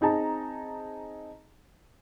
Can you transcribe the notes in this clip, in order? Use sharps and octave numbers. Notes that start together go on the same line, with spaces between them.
C4 D#4 G#4 A5 A#5